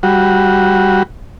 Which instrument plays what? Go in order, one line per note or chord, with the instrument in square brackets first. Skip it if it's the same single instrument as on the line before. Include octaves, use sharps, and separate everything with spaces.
[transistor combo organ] G3 F#4